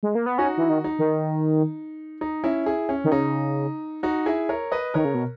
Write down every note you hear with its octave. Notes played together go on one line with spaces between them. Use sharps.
G#3
A#3
B3
C#4 D#4 F#4
E3
D#3
D#4
D#3
D#4
C#4 E4
E4 G#4
C#4
D#3
C#3 D#4
D#4 F#4
E4 G#4
A#4 C#5
B4 D#5
D#3 A#4 C#5
C#3
B2